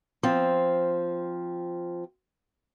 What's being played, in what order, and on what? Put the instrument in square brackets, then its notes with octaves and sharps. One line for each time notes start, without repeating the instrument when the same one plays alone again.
[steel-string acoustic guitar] F3 C4